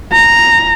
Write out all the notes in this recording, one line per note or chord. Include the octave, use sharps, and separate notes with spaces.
A#5